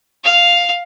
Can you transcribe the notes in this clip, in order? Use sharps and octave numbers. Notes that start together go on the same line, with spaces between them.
F5